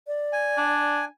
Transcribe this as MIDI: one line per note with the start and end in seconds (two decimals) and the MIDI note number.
0.07 0.78 74
0.33 1.05 80
0.57 1.03 62